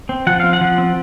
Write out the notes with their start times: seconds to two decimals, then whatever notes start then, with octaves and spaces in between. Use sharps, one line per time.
0.09 C4
0.27 F3 F#5
0.40 C4 F5
0.53 F#5
0.61 F3
0.78 C4